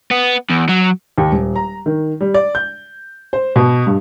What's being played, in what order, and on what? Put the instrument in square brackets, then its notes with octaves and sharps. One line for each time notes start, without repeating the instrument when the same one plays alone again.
[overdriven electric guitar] B3
E2
F#3
[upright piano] D#2
D#1
A#5
D#3
G3
D5
G6
C5
B2
G2